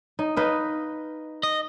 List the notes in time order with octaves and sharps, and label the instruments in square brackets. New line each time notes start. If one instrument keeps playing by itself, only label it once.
[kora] D#4
D#4 B4 F5
[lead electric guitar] D#5